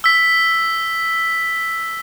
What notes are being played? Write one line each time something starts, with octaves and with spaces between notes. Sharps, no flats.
E6 B6